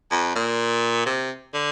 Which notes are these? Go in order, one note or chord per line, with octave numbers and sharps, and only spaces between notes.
F2
A#2
C3
D3